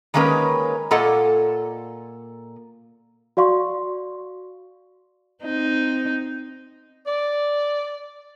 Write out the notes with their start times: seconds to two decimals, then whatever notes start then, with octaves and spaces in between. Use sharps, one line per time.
0.14 D#3 G#3 A#3 C#4 A#4 B4
0.91 A#2 A#3 F4 A4 D#5 F#5
3.37 F#4 D5 F5 C6 C#6
5.43 C4 D#4
7.06 D5